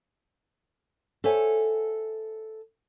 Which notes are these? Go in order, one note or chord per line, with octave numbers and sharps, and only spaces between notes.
A4 C5 C#5 E5 F#5 G#5